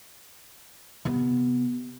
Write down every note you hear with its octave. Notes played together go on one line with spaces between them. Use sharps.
C3 B3